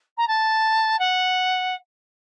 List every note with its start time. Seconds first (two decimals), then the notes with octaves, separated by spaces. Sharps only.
0.17 A#5
0.27 A5
0.99 F#5